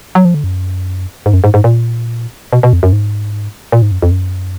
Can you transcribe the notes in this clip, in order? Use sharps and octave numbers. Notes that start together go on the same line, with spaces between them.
F#3
F3
D3
F#2
G#2
F#2
G#2
G#2
A#2
B2
B2
F2
F#2
G#2
A#2
G#2
F#2
F2
F#2